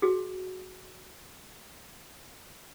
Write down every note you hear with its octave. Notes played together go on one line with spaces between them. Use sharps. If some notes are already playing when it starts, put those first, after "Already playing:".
F#4 G#4